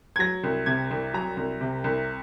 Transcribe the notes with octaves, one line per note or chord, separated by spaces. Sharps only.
G#6
F#3 A#6
C2
C3 G#6
C2
F#3 A#5
C2
C3
C2